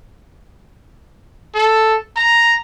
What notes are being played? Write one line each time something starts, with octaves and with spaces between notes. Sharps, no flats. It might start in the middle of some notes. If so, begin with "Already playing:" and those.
A4
A#5